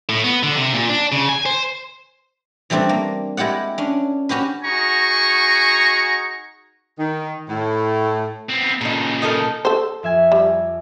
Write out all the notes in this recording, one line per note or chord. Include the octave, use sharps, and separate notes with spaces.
A2
B3
D3
C3
A#2
D4
C#3
G#5
C5
E3 G3 A3 C4 D4
A#3
G#3 E4 G4 D5 F#5
C#4 D4
C#4 F#4 G4 B4
D#4 F#4 G#4 G#5 A#5 C#6
D#3
A2
B3 C4
A#2 C#3 D#4 A4
D#4 A4 A#4
A4 C5
F2 E5 G#5
G3